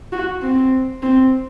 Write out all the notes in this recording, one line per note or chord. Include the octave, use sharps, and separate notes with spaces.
F#4
C4
C4